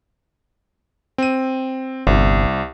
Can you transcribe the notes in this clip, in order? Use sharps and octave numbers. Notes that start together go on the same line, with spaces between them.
C4 D#7
G1 C2